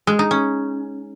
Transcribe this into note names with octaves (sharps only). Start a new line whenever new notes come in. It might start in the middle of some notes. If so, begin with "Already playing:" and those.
G#3
D#4
C#4